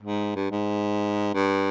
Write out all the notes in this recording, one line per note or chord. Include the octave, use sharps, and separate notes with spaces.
G#2
G2
G#2
G2